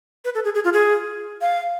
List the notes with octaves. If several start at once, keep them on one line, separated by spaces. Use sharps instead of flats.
B4
A4
G#4
G#4
F4
G#4
F5